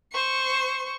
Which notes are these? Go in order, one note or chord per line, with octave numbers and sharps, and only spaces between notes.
C5 C#6